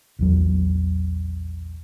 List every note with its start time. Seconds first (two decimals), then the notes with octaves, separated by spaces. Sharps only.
0.19 A#1 E2 F#3